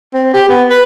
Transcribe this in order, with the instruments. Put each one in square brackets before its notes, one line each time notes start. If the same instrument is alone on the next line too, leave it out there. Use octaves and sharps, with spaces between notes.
[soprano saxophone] C4
G4
B3
B4